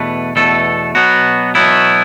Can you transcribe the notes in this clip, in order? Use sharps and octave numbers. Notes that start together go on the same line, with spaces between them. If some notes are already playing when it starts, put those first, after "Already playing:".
Already playing: E2 B2 A3 B4
E2 B2 A3 A4
B2 F#3 B3 F#4
B2 F#3 B3 E4